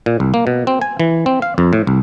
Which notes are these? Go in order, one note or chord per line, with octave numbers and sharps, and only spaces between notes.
A#2
C2
A#3
B2
C4
G#5
E3
C4
F5
F2
A2
C2